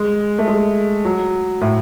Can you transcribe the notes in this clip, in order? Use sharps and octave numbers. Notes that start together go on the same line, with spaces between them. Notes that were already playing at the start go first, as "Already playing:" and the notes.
Already playing: G#3
A3
G#3
F#3
A2